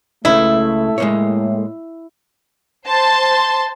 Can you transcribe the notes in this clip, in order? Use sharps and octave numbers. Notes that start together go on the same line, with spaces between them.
C#2 C#3 A3 E4
A2 G#3 A#3 C#5
C5 A5 C6